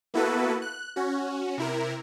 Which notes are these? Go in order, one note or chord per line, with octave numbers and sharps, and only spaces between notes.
A#3 B3 E4 F#4 A4 B4
F#6
C#4 F#4
C3 E4 A#4